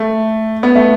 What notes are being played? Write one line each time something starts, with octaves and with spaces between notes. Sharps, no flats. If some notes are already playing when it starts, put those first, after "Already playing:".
Already playing: A3
B3
A3